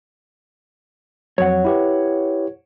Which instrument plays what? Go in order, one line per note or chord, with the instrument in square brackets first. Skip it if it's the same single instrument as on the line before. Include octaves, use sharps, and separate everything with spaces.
[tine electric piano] F2 F#3 [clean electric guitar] C#5 F#5
[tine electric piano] E4 G4 B4